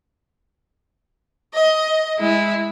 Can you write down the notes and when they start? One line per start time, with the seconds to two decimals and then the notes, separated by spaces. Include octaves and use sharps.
1.55 D#5
2.18 G#3 E4